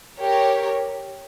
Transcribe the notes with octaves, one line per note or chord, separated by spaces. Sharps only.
G4 A#4 C#5